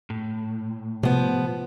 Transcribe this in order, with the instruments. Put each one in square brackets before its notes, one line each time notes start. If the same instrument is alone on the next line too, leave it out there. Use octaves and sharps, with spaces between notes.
[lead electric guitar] A2
[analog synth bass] C3 [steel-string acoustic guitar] F3 B3